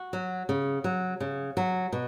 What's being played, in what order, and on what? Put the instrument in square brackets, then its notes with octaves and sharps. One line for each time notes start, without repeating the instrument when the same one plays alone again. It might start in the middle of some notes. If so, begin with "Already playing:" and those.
Already playing: [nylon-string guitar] F#4
F#3
C#3
F#3
C#3
F#3
B2